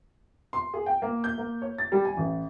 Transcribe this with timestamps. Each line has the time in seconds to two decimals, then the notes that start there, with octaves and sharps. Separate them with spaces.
0.53 C6
0.74 G#4
0.86 G5
1.02 A#3
1.24 G6
1.38 A#3
1.62 C#5
1.78 A6
1.92 G3
2.05 G#5
2.17 A1